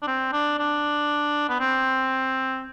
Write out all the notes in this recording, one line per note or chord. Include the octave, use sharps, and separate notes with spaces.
D4
C4
D4
D4
B3
C4